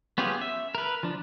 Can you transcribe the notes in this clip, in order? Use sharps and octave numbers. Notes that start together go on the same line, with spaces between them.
B3 C#4 F4 G4 G#4
E5
A#4 B4
F3 D4